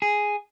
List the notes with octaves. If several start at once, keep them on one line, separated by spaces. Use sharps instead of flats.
G#4